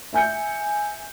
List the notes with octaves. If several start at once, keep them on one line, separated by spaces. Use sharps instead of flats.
E5 G#5 G6 C#7